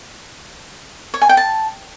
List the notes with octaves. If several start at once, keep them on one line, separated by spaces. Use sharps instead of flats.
C#5
G#5
G5
A5